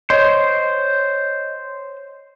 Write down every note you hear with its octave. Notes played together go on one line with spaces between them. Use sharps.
C5 C#5 D#5